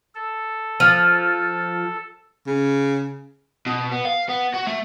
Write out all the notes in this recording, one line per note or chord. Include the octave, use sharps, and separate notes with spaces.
A4
F3
C#3
B2
B3
F5
B3
F#4
A3